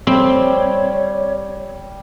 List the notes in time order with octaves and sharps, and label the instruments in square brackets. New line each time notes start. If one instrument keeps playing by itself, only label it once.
[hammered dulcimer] G3 [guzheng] C4 [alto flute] C#5